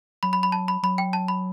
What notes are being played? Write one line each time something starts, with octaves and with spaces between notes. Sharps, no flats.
F#3 B5
B5
B5
A5
B5
F#3 B5
G5
A5
B5